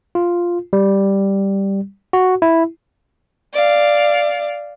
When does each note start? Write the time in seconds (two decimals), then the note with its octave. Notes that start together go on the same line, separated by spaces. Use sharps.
0.15 F4
0.73 G3
2.13 F#4
2.42 E4
3.54 D5 F5